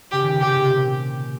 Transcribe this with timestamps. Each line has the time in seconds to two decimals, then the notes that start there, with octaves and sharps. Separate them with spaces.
0.11 C#3 G4
0.22 D#3
0.30 C#3
0.40 C3 G4
0.55 A#2